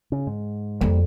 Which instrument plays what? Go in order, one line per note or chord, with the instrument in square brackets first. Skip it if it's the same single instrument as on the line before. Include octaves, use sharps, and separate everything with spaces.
[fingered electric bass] C#3
G#2
[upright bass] F2 [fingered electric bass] G3 A#3